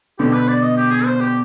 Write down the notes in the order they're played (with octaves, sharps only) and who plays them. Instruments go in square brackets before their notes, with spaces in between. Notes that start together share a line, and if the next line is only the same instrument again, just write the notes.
[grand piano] B2 D3 [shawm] G4
[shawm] B4
D5
D#5
G4
G#4
C5
G4